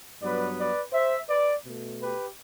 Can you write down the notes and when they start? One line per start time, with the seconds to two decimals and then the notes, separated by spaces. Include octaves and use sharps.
0.22 G2 F#3 B3 B4 D5
0.57 B4 D5
0.93 C5 E5
1.29 B4 D5
1.64 B2 A3
2.00 G4 B4